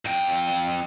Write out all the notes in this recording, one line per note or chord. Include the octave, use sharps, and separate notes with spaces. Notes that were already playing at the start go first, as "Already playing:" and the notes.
F2 G5